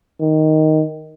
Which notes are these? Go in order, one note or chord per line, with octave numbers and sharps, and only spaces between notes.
D#3